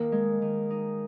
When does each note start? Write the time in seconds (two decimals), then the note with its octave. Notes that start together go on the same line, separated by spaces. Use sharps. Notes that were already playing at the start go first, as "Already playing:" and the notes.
Already playing: D#3 A#3
0.12 G#3
0.42 D#3
0.70 D#4